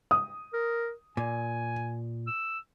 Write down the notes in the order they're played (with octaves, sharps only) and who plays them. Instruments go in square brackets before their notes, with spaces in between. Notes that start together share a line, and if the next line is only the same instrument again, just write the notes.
[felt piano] D#6
[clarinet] A#4
[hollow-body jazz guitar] A#2 [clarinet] G#5
[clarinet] E6